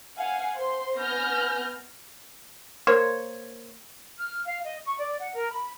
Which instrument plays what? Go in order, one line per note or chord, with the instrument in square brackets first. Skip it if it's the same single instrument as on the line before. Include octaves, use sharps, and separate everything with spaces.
[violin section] F5 F#5 G#5
C5 C6
B3 G#5 F6 G6 A#6
[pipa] A#3 C5 C#5
[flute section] F6
F5
D#5
C#6
D5
F#5
A#4
B5